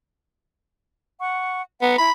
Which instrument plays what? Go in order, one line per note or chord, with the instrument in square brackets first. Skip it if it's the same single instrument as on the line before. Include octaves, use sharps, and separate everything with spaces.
[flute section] F#5 C#6
[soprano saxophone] B3 [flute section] F#5 A#5
[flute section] E4 [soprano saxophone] B5